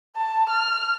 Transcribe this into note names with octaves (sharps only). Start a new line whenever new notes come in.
A5
F6